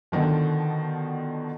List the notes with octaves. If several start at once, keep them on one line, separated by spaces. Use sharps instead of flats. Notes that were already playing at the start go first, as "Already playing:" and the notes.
B2 D3 D#3 F3